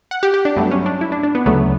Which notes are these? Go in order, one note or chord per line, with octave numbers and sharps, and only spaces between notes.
F#5
G4
G4
D4
G2 F#3 A3 B3
C#4
D4
E4
D4
D4
B3
D2 C#3 F#3 A3 B3